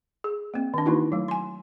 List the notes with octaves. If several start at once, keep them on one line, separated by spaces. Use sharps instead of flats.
G#4
A#3 C4
D#3 D4
D#3 E3 A#3 D#4 E4 F#4
F#3 A3
G#5 C6